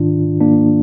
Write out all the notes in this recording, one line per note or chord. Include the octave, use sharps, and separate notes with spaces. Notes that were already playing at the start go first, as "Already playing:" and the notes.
Already playing: G#2 D#3 D4 F4
A#3 D4